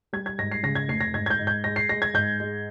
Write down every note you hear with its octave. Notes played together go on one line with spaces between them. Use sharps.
G3 G#6
G#6
G#2 A#6
C7
C#3 A#6
G#6
F1 C7
A#6
G#2 G#6
G#6
G6
G#2
G6
G#3 A#6
C7
G#3 A#6
G#6
G#2 G6
G#3